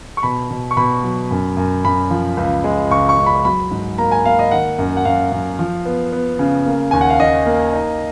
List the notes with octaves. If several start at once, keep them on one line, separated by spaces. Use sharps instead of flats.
C#6
B2 B5
B2
C#6
B2 B5
F#3
F#2
F#2
F#2 B5
F3
C#2
G#3
C#2 C#6
C#6
C#2
B5
F#3 B5
G#2
A#3 A#5
G#5
A#3 F5
D#5
D#3 F#5
F#2
F#5
F#2 F5
F#2
F3
B3
B3
C#3
A#3
D#2 G#5
F#5
F5
D#3 D#5
A#3
D#4